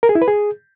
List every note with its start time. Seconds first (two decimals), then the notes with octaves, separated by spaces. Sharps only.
0.03 A#4
0.09 G#4
0.15 E4
0.22 B4
0.28 G#4